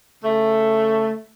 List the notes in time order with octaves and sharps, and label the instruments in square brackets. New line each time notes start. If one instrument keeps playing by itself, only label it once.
[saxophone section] C#3 A3